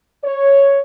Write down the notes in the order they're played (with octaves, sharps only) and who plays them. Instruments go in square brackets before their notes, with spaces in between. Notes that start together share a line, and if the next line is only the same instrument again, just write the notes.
[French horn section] C#5